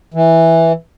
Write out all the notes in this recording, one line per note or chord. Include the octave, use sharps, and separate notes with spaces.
E3